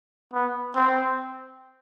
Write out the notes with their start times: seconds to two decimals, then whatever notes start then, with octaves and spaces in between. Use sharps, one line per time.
0.34 B3
0.76 C4